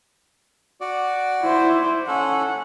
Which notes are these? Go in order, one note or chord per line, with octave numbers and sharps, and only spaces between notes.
F#4 D5
E4 C5
C#4 A4 F#5